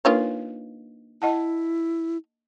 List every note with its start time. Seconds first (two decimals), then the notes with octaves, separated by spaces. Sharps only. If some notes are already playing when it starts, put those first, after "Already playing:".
0.05 D#3 A#3 D4 F4 B4 C#5
1.22 E4 D#5 F#5 A5